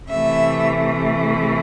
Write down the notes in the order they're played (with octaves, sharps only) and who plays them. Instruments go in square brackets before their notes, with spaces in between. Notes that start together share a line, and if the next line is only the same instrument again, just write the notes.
[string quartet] C3 E3 A3 E5